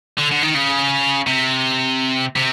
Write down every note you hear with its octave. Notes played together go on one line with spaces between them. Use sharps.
D3
D3
D#3
C#3
C3
C3